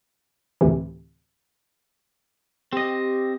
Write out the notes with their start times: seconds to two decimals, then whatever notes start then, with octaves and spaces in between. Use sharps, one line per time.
0.61 D2 A2 C3 E3
2.73 C4 G4 D#5